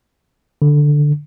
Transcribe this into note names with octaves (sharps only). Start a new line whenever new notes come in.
D3